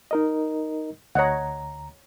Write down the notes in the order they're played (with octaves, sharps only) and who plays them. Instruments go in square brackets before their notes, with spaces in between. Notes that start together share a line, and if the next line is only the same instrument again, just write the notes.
[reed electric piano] D#4 A#4 D#5
[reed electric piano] D2 A#5 [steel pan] C#5 D#5 F#5